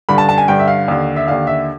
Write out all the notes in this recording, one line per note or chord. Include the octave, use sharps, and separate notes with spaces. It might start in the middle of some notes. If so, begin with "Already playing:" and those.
G2 D3 B5
A5
A5
G#5
G2 D3 G5
E5
F5
D#2 D3
E5
D#2 D3 F5
E5